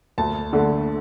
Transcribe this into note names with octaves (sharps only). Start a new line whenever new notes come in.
D2 A5
D3 A3